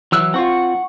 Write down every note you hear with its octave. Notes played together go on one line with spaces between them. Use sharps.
E3 F#3 E6 F#6
C4 F4 F#5 C#6